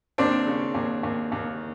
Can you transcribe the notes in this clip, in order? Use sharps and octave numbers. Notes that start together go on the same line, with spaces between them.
D#2 C4 D4
C#3
D#2
D#2
D#2